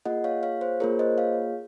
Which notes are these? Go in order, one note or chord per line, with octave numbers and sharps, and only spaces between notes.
A#3 F4 G#4 D#5 F#5
C#5 F5
C#5 F5
C5
A#3 F4 G#4 A#4 C#5
C5 D#5
C#5 F5